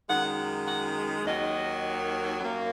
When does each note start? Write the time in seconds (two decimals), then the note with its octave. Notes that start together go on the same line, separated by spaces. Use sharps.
0.08 F#2 D#3 G#3 F#5
0.67 F#5
1.25 D#2 D#3 F#3 D#5
2.40 F#2 F#3 A#3